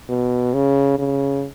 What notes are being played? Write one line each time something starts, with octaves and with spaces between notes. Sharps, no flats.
B2
C#3
C#3